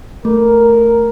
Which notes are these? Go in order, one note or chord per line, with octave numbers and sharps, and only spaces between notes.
A3 A#4